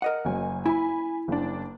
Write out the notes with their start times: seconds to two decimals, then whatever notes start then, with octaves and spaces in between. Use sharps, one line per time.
0.02 A#4 D#5 F#5
0.25 F#1 F#3 G#5
0.66 E4 G#5 B5
1.28 F#1 D4